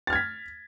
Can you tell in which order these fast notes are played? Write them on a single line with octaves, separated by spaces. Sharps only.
A6 F6 G#6 B6